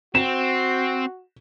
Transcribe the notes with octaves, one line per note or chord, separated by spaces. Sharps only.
C4 F#4 E7